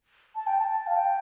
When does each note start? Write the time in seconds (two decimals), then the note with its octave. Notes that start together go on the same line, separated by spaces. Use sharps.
0.35 A5
0.47 G5
0.59 A5
0.87 F5
0.96 G5